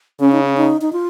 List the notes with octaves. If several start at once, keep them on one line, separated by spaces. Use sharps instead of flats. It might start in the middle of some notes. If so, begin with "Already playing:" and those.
C#3 C#4
D#4
C#4
D#4
D#4
F4